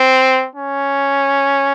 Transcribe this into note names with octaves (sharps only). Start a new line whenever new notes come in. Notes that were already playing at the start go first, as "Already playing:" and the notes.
Already playing: C4
C#4